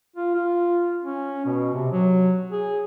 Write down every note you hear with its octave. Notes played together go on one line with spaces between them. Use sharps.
F4
F4
C#4
B2
C3
F#3
G#4